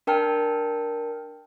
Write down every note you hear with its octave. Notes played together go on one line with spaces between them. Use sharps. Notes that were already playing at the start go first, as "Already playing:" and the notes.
D4 A#4 G5 A5 F6